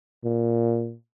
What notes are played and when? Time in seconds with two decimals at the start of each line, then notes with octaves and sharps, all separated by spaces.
0.24 A#2